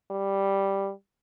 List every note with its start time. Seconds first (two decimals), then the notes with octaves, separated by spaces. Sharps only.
0.11 G3